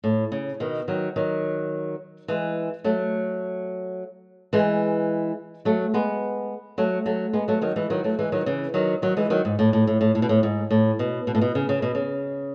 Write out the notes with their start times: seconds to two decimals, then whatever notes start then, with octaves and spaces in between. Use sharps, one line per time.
0.04 A2
0.32 C#3
0.60 B2 D#3
0.88 D#3 F#3
1.16 D#3 F#3
2.28 E3 G#3
2.84 F#3 A3
4.53 E3 G#3
5.65 F#3 A3
5.94 G#3 B3
6.78 F#3 A3
7.06 F#3 A3
7.33 G#3 B3
7.48 F#3 A3
7.61 D#3 F#3
7.76 E3 G#3
7.90 D#3 F#3
8.04 F#3 A3
8.19 E3 G#3
8.32 D#3 F#3
8.46 C#3 E3
8.74 D#3 F#3
9.02 D#3 F#3
9.17 E3 G#3
9.30 D#3 F#3
9.45 G#2
9.59 A2
9.73 A2
9.87 A2
10.01 A2
10.15 A2
10.22 B2
10.29 A2
10.43 G#2
10.71 A2
10.99 B2
11.27 B2
11.35 A2
11.41 B2
11.55 C#3
11.69 C#3
11.82 B2
11.95 C#3